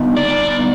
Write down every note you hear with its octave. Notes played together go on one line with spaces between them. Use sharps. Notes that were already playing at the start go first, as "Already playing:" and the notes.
Already playing: D3 G3 B3 D#4
D5